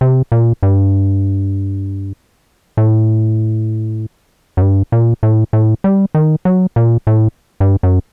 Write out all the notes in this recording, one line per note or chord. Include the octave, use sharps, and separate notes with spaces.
C3
A#2
G2
A2
F#2
G2
A#2
A2
A2
G3
D#3
F#3
A#2
A2
G2
F#2